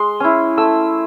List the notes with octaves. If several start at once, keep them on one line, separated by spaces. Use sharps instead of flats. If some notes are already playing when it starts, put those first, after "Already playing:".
Already playing: G#3 C6
C#4 E4
A3 E6